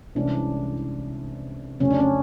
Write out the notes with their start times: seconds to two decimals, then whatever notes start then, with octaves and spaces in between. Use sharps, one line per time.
0.15 C2 C3 E3 G#3 C#4 D4
1.80 F2 C#3 F#3 A3 C4 C#4
1.91 D4
2.00 C#4